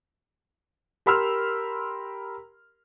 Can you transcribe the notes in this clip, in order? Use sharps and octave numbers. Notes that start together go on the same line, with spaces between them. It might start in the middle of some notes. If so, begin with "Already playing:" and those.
G4 A#4 B5 C6 E6 F6